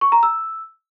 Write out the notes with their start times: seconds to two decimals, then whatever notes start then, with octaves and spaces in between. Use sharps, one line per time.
0.01 C#6
0.12 A#5
0.23 E6